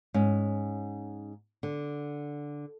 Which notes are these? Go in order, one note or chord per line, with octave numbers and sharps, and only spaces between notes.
G#2 C#4
D3